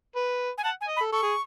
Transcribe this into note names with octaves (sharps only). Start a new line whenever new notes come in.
B4
G#5
F#5 A5
G#5
D#5
B5
A4
A4 C#6
G#4